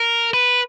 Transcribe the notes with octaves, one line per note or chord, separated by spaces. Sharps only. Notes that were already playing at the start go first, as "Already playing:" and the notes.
Already playing: A#4
B4